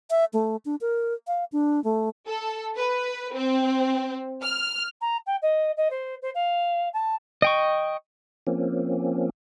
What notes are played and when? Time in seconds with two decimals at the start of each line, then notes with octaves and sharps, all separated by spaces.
0.10 E5
0.33 A3
0.65 D4
0.81 A#4
1.27 F5
1.52 D4
1.84 A3
2.26 A4
2.77 B4
3.33 C4
4.42 F6
5.01 A#5
5.26 G5
5.42 D#5
5.77 D#5
5.90 C5
6.22 C5
6.34 F5
6.93 A5
7.42 D#5 G5 C#6
8.47 F3 A#3 C4 C#4